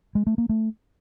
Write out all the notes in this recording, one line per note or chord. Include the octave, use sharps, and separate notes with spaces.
G#3
A3
A#3
A3